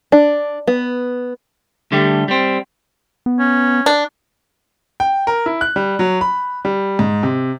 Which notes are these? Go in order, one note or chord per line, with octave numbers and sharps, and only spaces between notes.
D4
B3
D3 G3 A3 G4
G3 C4
B3
C#4
D4
G5
A#4
E4
F#6
G3
F#3
B5
G3
G#2
C3